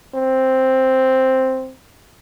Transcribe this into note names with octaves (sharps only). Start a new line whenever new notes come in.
C4